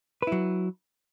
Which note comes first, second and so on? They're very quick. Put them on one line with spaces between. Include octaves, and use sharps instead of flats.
B4 E4 F#3